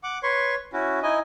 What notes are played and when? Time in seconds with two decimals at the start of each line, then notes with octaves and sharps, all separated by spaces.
0.04 F#5 D6
0.23 B4 C#5 C6 C#6
0.73 C#4 E4 F#4
1.03 D#4 E4 D#5 G#5